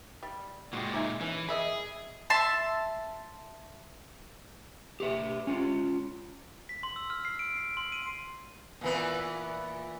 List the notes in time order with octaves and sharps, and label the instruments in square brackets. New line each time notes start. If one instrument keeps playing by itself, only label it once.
[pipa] G3
[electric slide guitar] A#2 G#3 [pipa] F#4 G4
[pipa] D#4 E5 G#5
[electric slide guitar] E3 [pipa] C#4
[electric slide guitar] G#4 [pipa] D#5 E5 B5
[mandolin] E5 A5 C6
[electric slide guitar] G4 B4 E5
C#4 F4
[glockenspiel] B6
C6
E6
F6
C7
D7
C7
C6
D#7
[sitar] A#2 E3 B3